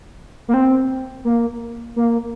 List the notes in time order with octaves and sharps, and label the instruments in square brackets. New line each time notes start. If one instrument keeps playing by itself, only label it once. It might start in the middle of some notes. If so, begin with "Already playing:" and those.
[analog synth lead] A#3
C4
A#3
A#3